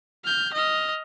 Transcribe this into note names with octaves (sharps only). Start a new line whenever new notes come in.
F6 G6
D#5 F6